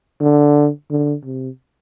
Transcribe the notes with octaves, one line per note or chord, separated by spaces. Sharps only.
D3
D3
C3